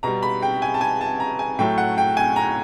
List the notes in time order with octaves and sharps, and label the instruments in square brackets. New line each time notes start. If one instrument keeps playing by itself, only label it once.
[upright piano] B2 G3 A#5
B5
G5
G#5
A5
G#5
A5
A#5
G#5
A2 F#3 A3 G5
F#5
G5
G#5
A#5